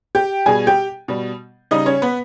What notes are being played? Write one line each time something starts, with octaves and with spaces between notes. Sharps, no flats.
G4 G5
B2 G3 G#4 G#5
G4 G5
B2 G3
C#3 G3 D#4 D#5
C#4 C#5
B3 B4